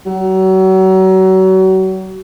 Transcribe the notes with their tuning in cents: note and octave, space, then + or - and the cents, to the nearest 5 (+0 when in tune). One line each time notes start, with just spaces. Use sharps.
F#3 +35